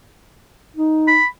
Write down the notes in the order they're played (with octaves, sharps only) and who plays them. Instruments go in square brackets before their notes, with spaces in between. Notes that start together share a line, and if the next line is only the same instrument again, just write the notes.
[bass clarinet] D#4
[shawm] B5